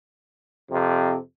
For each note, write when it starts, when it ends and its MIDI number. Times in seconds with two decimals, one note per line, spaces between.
0.71 1.16 41
0.71 1.16 48